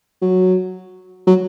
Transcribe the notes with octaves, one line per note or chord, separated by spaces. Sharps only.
F#3
F#3